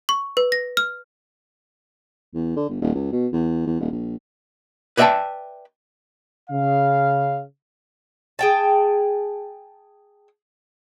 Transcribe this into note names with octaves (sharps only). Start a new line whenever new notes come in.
C#6
B4
A#6
F6
E2
D3
G1
D#1
C#2
B2
E2
E2
D#1
A#1
B4 D5 E5 F5 G5 A5
C#3 F5
G#4 G5 A5